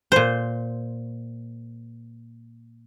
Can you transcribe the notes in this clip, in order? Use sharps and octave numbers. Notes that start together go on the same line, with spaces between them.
A#2 C5